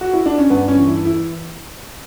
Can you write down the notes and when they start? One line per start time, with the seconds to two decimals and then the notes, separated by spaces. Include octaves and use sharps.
0.01 F#4
0.13 E4
0.26 D4
0.38 C#4
0.50 G2 B3
0.68 C#4
0.77 E3
0.87 E4
1.05 E4